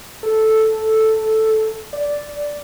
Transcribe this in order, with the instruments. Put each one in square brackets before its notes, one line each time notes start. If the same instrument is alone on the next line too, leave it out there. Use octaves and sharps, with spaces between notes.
[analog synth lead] A4
D5